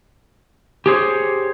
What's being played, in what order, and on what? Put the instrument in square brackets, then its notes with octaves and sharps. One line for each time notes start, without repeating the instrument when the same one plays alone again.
[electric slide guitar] G4 G#4 C5 C#5